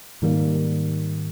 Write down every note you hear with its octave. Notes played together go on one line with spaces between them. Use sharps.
G#2 D#3 G3 A#3